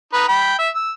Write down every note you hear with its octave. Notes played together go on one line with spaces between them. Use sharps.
D#4 B4
G5 B5
E5
E6